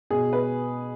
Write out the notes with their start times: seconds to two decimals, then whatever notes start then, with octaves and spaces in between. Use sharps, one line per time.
0.11 B2 G#4
0.33 B4